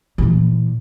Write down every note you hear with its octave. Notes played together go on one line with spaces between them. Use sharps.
A#2 E3